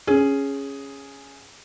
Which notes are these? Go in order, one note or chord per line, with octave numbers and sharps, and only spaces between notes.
C#4 G#4